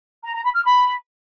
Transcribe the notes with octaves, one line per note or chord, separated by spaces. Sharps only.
A#5
A#5
B5
F6
B5